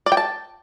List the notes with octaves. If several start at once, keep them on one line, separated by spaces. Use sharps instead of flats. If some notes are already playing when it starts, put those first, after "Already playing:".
D5
G5
A5